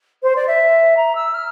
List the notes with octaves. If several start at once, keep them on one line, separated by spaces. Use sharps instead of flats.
C5
D5
E5
A#5
E6
F6